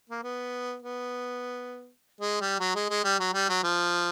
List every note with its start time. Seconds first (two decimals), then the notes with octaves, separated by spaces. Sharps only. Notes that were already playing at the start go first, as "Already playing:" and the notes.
0.10 A#3
0.23 B3
0.82 B3
2.21 G#3
2.41 G3
2.60 F#3
2.75 G#3
2.90 G#3
3.05 G3
3.20 F#3
3.34 G3
3.49 F#3
3.63 F3